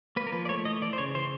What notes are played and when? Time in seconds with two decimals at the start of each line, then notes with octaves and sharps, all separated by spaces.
0.16 A#3 B4
0.27 A#4
0.32 F3 B4
0.45 D5
0.49 A3 C#5
0.65 E3 D#5
0.82 E3 D5
0.93 C5
0.98 C#3 C#5
1.15 E3 C5